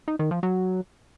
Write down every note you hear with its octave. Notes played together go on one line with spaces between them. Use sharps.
D#4
D#3
F3
F#3